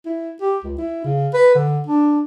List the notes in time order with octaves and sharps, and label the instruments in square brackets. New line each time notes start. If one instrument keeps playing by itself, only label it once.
[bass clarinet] E4
G4
C#2
E4
C#3
B4
D3
D4